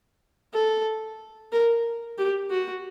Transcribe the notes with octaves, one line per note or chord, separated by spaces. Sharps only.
A4
A#4
G4
F#4